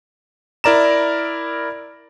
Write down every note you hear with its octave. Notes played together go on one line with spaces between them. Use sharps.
E4 A#4 D5 A#5 E7